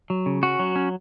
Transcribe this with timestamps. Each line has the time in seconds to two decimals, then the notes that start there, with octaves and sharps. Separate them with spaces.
0.10 F#3
0.26 C#3
0.43 C#4 F#4
0.59 F#3
0.76 C#4